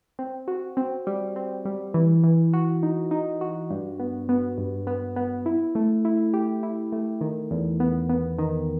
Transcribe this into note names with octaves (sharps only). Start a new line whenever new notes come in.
C4
F#4
C4
G3
C4
G3
E3
E3
F#4
D#4
D#4
F#4
G2
B3
B3
G2
B3
B3
E4
A3
E4
G4
E4
A3
D#3
E2
B3
B3
D#3